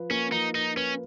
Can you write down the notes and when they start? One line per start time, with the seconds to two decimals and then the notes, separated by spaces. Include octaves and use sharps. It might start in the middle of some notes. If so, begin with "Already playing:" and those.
Already playing: F3 F4 B4
0.10 A#3 C#4
0.32 F3 D#4
0.55 D#4 F4
0.76 C#4 B4